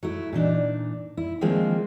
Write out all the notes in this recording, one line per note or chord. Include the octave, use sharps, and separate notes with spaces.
F#3 A3 E4
A#2 E3 D4 D#4
E4
D#3 F3 G#3 A#3 C4 D4